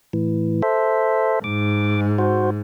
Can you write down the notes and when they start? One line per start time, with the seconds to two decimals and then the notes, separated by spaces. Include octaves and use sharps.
0.13 A2 E3
0.62 A4 C5 E5
1.44 G#2 D6
2.18 F#4 C5